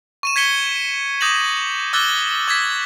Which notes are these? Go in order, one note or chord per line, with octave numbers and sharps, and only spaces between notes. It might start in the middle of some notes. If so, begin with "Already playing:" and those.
C#6 D#7 E7
G#6 B6 C#7 G7
D6 D#6 G6 A#6 E7 F#7
D6 E6 F#6 A6 G7
D6 G#6 A6 B6